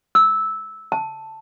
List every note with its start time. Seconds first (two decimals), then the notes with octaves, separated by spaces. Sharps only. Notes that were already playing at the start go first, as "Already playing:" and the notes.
0.15 E6
0.92 A5